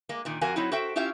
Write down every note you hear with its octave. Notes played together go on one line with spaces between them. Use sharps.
G#3 A#3
A#2 D#3
F2 F#4 A#4 F5 G#5
F#3 C4 D#4 E4
F#4 A4 C5 E5 G5
C#4 E4 F4 G4 E5 F5